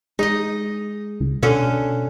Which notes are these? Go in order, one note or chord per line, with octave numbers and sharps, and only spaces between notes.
G#3 D#4 D#5
C#2
B2 D3 C#4 A4